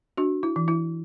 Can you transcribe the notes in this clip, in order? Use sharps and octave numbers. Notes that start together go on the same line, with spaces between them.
D4 F#4
E4
E3
E4